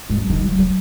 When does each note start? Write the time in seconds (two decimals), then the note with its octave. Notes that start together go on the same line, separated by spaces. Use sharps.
0.10 G#2
0.16 F#2
0.30 D#3
0.44 F#3
0.59 F#3